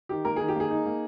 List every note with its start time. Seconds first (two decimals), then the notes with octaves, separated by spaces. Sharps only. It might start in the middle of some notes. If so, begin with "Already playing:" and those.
0.09 D#3 G4
0.25 A#3 A#4
0.36 D#3 G#4
0.48 G4
0.56 A#3 G#4
0.70 D#4
0.86 A#3